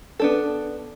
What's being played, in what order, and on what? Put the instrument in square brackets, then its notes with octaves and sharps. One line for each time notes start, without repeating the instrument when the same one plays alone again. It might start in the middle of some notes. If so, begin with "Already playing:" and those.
[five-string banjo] B3 D4 A4